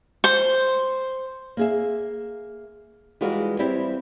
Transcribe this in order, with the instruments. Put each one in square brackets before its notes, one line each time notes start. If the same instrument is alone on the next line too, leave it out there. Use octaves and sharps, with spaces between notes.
[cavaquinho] C5
[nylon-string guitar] A#3 G#4 E5
E3 G3 G#3 F4 F#4 A#4
G3 C4 E4 G4